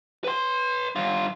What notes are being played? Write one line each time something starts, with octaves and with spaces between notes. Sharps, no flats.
B4 C6
G2 F4